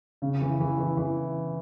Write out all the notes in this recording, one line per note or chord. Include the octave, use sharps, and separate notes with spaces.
C#3
E3
E3
E3
E3